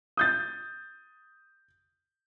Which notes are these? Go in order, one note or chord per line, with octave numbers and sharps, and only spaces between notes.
D#6 G6 A6